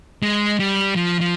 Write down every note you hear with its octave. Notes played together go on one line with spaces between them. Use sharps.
G#3
G3
F3
F3